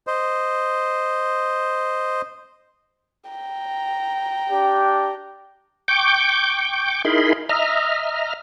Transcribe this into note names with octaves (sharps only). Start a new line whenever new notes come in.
C5 D#5
G5 A#5
D4 G4
G5 C#6 D6 G6
D#4 E4 G#4 A#4 B5 C6
D#5 E5 A#5 F6